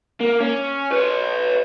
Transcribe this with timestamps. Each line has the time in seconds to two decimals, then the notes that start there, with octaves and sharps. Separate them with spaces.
0.21 A#3
0.41 C#4
0.93 B4 C#5